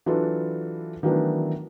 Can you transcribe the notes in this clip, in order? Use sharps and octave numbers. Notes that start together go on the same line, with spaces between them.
E3 F#3 D4 F4 A4 B4
D#3 E3 F#3 A3 B3 D4